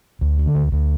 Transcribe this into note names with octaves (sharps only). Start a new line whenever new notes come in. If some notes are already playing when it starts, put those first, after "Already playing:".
D2
D3
D2
D2